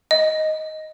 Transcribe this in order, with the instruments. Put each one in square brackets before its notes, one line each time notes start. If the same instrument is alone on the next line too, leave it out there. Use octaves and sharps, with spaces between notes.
[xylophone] D#5